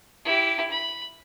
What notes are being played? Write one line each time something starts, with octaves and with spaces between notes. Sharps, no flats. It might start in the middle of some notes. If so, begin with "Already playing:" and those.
E4 G4
B5